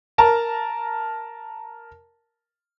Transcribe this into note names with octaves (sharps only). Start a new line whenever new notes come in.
A#4 A5 A#5